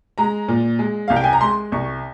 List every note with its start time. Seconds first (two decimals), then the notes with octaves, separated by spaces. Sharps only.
0.18 G#3 A#5
0.48 A#2
0.79 G#3
1.08 C2 F5
1.16 G5
1.24 G#5
1.33 A#5
1.41 G#3 C6
1.72 C2 C#6